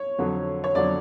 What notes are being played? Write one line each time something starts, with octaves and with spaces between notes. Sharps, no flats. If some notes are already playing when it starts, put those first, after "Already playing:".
Already playing: C#5
F2 D3 F#3
C#5
F2 D3 F#3 D5